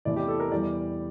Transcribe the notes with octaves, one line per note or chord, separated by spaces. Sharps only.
E2 C3 E3 A3 E4 D5
G4
A4
A#4
E2 E3 G3 D5